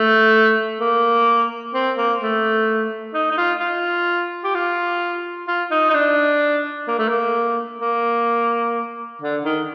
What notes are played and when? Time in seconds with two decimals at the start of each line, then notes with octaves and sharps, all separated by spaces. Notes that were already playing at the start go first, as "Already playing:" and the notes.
Already playing: A3
0.80 A#3
1.74 C4
1.97 A#3
2.21 A3
3.14 D#4
3.31 D#4
3.37 F4
3.60 F4
4.44 G4
4.54 F4
5.47 F4
5.71 D#4
5.90 D#4
5.94 D4
6.88 A#3
6.99 A3
7.09 A#3
7.81 A#3
9.21 D3
9.45 D#3